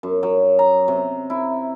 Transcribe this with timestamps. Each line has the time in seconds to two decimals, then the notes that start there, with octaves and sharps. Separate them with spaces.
0.03 F#2
0.23 F#3
0.59 A#5
0.88 C3
1.30 E4